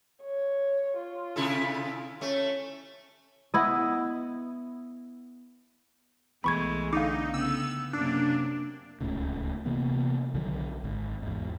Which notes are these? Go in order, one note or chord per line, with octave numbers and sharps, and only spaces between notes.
C#5
F4
C3 E4 A4
A3 C#4
B3 E4 D#5
B1 E3 G#3 A3 B3 B5 C#6 G#6
D3 D#4 F5 D6
C#3 B3 G5 E6
F#2 C3 A#3 D4
D1 C#2 A2 C#3
C3 E3 A#3 B3
B1 D3 D#3 F#3
G#1
E2 G#2